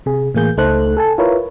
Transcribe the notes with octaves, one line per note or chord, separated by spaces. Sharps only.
C3 G#4
A2 E3 A#3 G#4 G6
C#2 A3 D#4 A4 C5 F#6
A4 G#5 A5
E4 F4 A#4 B4 C#5